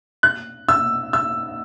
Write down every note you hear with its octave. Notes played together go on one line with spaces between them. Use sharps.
F#6
E6
E6